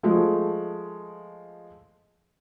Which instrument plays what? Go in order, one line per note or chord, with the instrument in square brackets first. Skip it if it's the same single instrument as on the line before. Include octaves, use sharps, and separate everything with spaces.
[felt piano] F3 G#3 A3